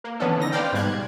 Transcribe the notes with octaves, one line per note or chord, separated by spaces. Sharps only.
A#3
E3 B3 C#4 D4 A4
D3 D#4 A#6
B4 C5 D5 F5 G5
G#2 B2 G3 F#6 G#6